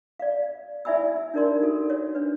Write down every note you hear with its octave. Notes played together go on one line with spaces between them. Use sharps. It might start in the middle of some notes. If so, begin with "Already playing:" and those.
D5 F5
E4 D5 E5 G#5 B5 E6
D4 D#4 A#4 D5 C6
F#4 A4
C#5
D4 B4